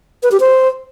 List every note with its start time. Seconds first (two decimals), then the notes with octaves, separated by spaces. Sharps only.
0.23 B4
0.32 G4
0.40 C5